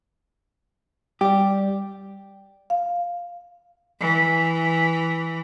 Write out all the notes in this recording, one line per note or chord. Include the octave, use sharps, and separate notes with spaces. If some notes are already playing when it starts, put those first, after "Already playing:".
G3 G4 D5
F5
E3